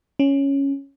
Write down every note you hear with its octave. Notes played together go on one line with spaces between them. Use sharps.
C#4